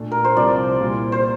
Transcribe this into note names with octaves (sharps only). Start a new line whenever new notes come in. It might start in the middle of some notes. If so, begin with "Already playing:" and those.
Already playing: A#2 A3 D4 F4
A#4
C5
C2 C3 F3 C4 F4 D5
A#2 G3 A#3 E4
C5